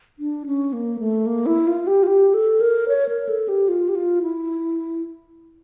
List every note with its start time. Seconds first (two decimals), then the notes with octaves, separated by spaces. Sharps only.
0.19 D4
0.46 C#4
0.73 A#3
0.99 A3
1.26 A#3
1.46 E4
1.67 F4
1.87 G4
2.03 F4
2.07 G4
2.34 A4
2.60 A#4
2.89 C#5
3.09 A#4
3.29 A4
3.49 G4
3.69 F4
3.89 G4
3.95 F4
4.22 E4